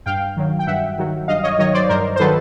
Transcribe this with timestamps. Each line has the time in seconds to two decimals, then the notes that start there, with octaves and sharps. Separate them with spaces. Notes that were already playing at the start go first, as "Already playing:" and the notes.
0.06 G2 F5 G5
0.37 D#3 F#3
0.59 G5
0.67 G2 E5 F#5
0.98 D#3 F#3
1.28 G2 D#5 F5
1.44 C#5 D#5
1.59 D#3 F#3 C#5 D#5
1.74 C5 D5
1.89 G2 A#4 C5
2.16 C5
2.20 D#3 F#3 A4 B4